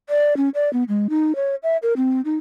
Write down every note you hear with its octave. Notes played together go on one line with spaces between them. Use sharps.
D5
C#4
D5
B3
G#3
D#4
C#5
E5
A#4
C4
D#4